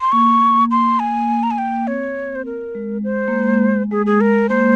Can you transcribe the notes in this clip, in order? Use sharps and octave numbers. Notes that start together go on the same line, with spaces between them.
C6
A#3 C#6
C6
G#5
A#3
A#5
G#5
G5
C4 C#5
C5
A#4
G#3
C5
A#3
G#3
G#3 G#4
G#4
A#4
A#3 C5